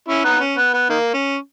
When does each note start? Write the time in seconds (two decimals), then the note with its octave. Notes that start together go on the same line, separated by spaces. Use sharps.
0.08 C#4 E4
0.25 B3 D#4
0.40 C#4
0.57 B3
0.74 B3
0.90 D#3 A#3
1.14 C#4